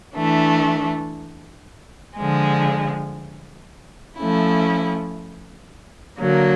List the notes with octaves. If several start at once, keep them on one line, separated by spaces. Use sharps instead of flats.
E3 A3 D4
D3 F3 G#3
F3 A3 C#4 E4
D3 F#3 A#3